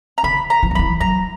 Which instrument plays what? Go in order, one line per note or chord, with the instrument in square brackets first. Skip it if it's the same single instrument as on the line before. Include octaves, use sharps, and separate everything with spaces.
[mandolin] A#5
[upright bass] D3 [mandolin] B5
[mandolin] A#5
[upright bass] E3
F#3
[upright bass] E3 [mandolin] B5
[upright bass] F#3 [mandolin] A#5